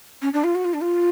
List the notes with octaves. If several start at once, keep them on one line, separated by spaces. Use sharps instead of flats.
C#4
D4
F4
F#4
F4
D4
F4